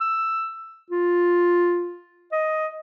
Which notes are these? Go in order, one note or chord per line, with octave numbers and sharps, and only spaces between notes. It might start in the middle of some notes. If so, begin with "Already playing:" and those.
E6
F4
D#5